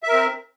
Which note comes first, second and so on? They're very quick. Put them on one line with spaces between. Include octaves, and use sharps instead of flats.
E5 A#4 C4